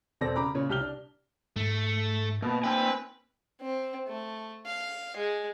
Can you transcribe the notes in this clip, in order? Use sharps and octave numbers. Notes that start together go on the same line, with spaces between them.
E1 C4 A4 D5 A#6
C#3 A#5 B5 D6
A#2 C#3 C#5
C2 G4 F6 G7
D4
G#2 A3
B2 A#3
C4 B4 G#5
C4
A3
F5
G#3